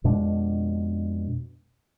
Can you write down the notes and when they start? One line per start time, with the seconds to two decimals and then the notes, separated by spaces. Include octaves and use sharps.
0.04 F2 B2 G#3 D4